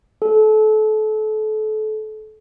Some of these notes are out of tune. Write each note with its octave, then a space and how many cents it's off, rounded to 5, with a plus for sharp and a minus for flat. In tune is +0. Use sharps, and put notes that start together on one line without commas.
A4 -30